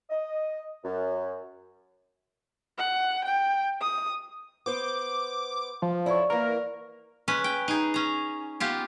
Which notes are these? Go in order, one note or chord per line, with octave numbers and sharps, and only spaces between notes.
D#5
F#2
F#5
G5
D#6
B3 C5 D6
F3
E4 A4 C#5 D5 C#6
E3 A#3 A#4
G#3 C#4 B4
G5
D#4 G#4
C#4 A#5
B3 F4 G4